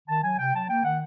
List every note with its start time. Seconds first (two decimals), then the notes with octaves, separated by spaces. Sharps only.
0.09 D#3 A5
0.24 F#3 G#5
0.39 C3 G5
0.54 F#3 A5
0.69 A#3 G5
0.84 D#3 F#5